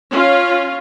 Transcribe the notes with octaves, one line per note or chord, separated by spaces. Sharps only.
C#4 F4